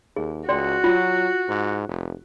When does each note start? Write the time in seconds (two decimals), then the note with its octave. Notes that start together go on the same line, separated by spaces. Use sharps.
0.16 D#2 G#4
0.49 C#2 F#4 D5 G5 C6
0.84 F#3 F4
1.48 G#2
1.89 F1